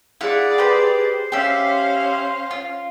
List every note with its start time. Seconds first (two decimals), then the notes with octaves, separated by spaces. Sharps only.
0.21 E4 G#4 D5 F5 F#5
0.58 G4 B4 C5
1.32 C#4 G4 E5 F5
2.51 F4